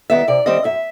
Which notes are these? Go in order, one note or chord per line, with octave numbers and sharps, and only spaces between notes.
D#3 G3 B3 E5
C3 D5
D#3 G3 C4 D#5
F#2 E5